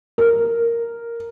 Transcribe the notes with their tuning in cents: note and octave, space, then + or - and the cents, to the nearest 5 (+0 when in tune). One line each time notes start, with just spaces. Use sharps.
A#4 -5